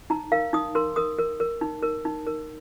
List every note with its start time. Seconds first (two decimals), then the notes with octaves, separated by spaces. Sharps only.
0.10 D#4 A#5
0.32 A#4 F5
0.53 D#4 D#6
0.75 A#4 C6
0.96 A#4 D#6
1.18 A#4
1.40 A#4
1.61 D#4
1.83 A#4
2.05 D#4
2.27 A#4